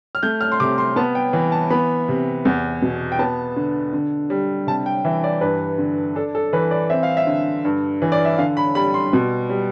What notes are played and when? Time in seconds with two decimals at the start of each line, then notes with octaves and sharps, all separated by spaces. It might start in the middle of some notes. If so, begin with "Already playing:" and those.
0.15 F6
0.23 A3 G6
0.41 F6
0.52 C6
0.60 C3 D6
0.78 C6
0.96 B3 A5
1.15 G5
1.33 E3
1.52 A5
1.70 B3 B5
2.08 C3
2.45 E2
2.82 B2
3.12 G5
3.19 B3 A5
3.56 D3
3.93 D3
4.30 G3
4.67 C3 A5
4.86 G5
5.05 E3 E5
5.24 D5
5.41 G2 B4
5.78 D3
6.15 D4 A4
6.35 A4
6.53 E3 B4
6.71 D5
6.90 C4 E5
7.03 F5
7.17 E5
7.27 D3
7.65 G2
8.02 E3
8.12 D5
8.25 E5
8.38 D3 F5
8.57 B5
8.75 G3 B5
8.94 C6
9.13 B2
9.50 G3